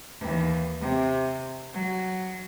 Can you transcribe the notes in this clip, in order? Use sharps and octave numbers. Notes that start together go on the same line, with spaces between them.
D#2 E3
C3
F#3